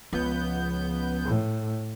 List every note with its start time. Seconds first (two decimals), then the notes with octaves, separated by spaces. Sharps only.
0.13 C#2 F3 B3 G6
1.25 A2